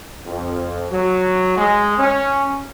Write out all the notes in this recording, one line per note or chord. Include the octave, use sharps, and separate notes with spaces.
F2
F#3
G#3
C#4